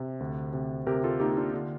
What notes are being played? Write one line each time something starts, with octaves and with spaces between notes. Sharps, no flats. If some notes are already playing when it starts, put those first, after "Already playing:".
Already playing: C3
D2
C3
C3 G4 A#4
F4 A4
A#3 D#4 G4
D4 F4
D3